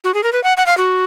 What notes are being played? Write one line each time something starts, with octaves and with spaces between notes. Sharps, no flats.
F#4
G#4
A#4
B4
F#5
F#5
F5
F#4